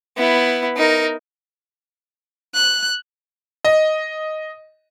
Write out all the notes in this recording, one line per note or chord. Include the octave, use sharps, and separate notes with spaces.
B3 E4
D#4 A#4
F#6
D#5